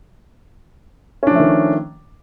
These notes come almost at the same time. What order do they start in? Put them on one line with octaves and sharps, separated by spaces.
C#4 D4 F3 A3 D#3